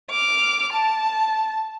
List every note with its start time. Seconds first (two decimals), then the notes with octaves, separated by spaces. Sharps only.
0.11 D6 F6
0.73 A5